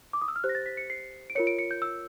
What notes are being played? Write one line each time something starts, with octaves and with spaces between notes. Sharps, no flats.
D6
D#6
E6
F6
G4 C5 F#6
A#6
A6
B6
C#7
C7
D7
F4 A#4 C#5 C#7
D7
C#7
G6
E6